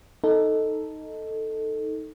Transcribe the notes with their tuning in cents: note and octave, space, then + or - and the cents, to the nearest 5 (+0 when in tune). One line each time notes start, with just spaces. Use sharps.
D#4 +5 A4 +0